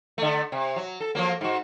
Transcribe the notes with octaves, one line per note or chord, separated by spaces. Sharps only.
D3 A3
C3
F#3
A4
F3 F#3 A#3
G#2 F#4